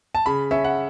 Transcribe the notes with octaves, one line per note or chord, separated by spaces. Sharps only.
A5
C#3 B5
C#4 E5
F#5